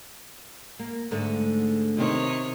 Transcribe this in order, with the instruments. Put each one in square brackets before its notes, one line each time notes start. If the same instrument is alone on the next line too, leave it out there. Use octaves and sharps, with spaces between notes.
[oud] A#3
G#2 D3 A3
[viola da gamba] C3 D#3 C#5